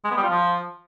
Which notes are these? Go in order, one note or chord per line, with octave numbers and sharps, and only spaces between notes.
G#3
B3
G3
F4
F3